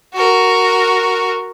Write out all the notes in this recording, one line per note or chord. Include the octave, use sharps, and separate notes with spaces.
F#4 A#4